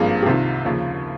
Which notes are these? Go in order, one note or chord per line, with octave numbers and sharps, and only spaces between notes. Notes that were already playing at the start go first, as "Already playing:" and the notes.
Already playing: G#1 G2 F3 A#3 G#4
G4
C2 C3 D#3 F4
D#2 C#3 F3